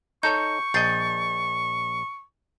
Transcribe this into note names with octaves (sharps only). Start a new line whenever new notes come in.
D#4 A4 C#5 C#6 G6
A#1 D#5 G6 A6 C7